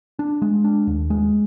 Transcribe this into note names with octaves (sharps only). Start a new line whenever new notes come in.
D4
G#3
D4
D#2
G#3